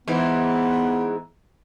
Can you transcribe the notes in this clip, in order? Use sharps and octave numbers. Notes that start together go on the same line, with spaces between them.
G#2 E3 B3